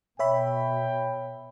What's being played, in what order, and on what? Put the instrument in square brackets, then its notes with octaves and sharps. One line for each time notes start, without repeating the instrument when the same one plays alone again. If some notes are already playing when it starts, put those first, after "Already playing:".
[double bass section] B2 [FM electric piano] C#5 E5 B5 [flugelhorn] G5